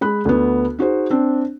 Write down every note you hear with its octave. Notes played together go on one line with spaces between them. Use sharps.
G#3 B5 F#6
D2 B3
D#4 F#4 G#4 C5
C4 D4